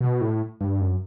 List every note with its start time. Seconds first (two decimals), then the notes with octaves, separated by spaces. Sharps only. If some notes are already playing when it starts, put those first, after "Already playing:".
0.01 B2
0.21 A2
0.61 G2
0.81 F#2